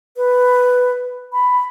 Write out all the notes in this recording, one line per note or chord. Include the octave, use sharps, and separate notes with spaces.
B4
B5